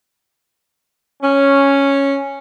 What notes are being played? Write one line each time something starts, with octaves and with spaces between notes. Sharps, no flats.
C#4